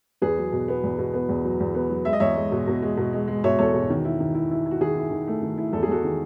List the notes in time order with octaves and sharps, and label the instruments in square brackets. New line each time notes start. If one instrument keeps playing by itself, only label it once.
[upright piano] E2 G#4 B4
F#3
B2
B3
E2
B2
B3
E2
F#3
E2
B3
F#3
G#3 E5
D#5
E2 C#5 E5
G#3
B2
B2
G#3
B2
G#3
G#3
B2 C#5 E5
E2 A4 C#5
B2
D#3
E4
D#3
E4
E4
E4
F#4
D#3 G#4
E4
D#3
A3
D#3
E4
E2 A4
G#4
E2 F#4 A4
D#3